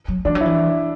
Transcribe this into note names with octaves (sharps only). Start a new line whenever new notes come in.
F#3
E3 D4
F#3
E4
E3